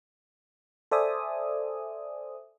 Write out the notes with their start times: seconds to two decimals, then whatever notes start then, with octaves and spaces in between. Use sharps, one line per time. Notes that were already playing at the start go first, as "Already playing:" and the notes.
0.91 A4 C5 D5 E5 G#5 D#6